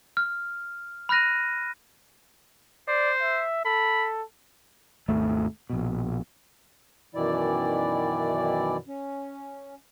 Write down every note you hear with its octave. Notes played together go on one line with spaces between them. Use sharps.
F6
B5 F6 F#6 A#6 D#7
C5 D5
E5
A4 B5
G#1 D#2 A3
A#1 B2
F#2 B2 D#3 E3 E4 D5
C#4